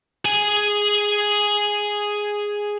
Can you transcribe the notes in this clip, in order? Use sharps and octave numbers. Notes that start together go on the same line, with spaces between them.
G#4 G#5